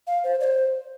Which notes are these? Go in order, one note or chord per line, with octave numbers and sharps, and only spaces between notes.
F5
C5
D5
C5